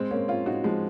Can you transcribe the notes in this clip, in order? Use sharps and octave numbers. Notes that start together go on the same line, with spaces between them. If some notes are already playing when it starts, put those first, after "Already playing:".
Already playing: G#3 C4
A#3 C#4
C#4 F4
D#4 F#4
F3 G#3